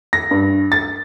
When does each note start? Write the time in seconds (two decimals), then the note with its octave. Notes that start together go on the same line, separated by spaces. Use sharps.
0.13 A#6
0.31 G2
0.72 A6